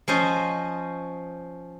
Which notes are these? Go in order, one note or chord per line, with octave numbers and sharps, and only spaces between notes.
F3 C#4 C5 D#5